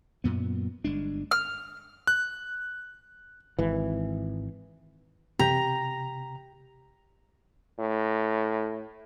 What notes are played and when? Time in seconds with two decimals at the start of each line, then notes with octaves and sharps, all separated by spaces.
0.24 F#2 A#2 B3
0.84 G1 G#3 D4
1.31 F6
2.07 F#6
3.59 G#1 E3
5.39 C3 G4 A#5
7.79 A2